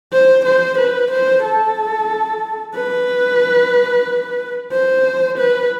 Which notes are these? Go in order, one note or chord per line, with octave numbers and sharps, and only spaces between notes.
C5
C5
B4
C5
A4
B4
C5
B4